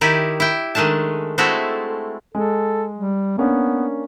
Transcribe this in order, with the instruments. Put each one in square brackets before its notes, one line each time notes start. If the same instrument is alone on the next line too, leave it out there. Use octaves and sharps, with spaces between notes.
[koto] D#3 D#4 E4 G4 D5
E4 G5
D#3 G#3 A3 D4 A5
G#3 A3 C4 E4 F#4 A4
[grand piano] G#3 [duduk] A4
[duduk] G3
[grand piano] A#3 C#4 D4 [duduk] B3